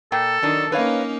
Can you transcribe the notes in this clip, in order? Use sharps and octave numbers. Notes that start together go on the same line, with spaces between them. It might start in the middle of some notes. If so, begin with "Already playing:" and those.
A#2 A4 G5
D#3 F#3 D4 D#4
A#3 C#4 D#4 B4 C#5 F5